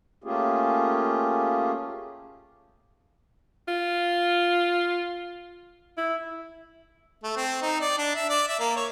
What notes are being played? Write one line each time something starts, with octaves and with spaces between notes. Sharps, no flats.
A3 A#3 C#4 F4 G4 G#4
F4
E4
A3
C4
D#4
D5
D4
E5
D5
E5
A#3
C#5